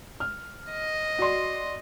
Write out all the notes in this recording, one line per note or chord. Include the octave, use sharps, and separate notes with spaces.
F6
D#5
F#4 D5 C6